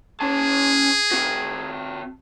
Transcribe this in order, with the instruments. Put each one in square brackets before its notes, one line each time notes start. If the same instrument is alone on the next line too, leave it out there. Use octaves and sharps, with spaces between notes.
[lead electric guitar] C#4 A5 [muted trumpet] G#4
[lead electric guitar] C4 F#4